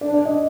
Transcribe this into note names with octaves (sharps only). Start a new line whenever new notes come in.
D4 D5
D5
D4
D#5